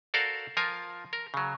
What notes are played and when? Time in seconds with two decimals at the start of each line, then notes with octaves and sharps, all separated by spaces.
0.14 F#4 A4 A#4 C5 D5 F5
0.57 F3 F4 A#4 G#5
1.13 A#4
1.34 C#3 F#3